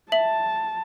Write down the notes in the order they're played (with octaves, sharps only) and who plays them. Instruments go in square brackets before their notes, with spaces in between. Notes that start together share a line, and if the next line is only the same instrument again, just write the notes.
[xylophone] E5 F#7 [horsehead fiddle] A5